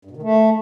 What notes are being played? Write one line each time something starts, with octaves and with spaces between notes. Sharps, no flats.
G2
B2
D#3
A3